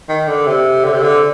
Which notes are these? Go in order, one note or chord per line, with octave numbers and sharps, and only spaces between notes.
D#3
D3
C3
D3
C3
D3